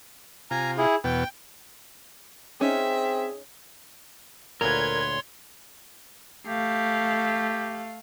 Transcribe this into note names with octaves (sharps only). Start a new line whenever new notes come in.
C3 F4 G#5 A#5
E4 G#4
E2 B2 B3 G5
C4 C#4 D#4 G#4 E5
D2 A#2 A#4 B4 C#5 C6 G#6
A3 G4 F5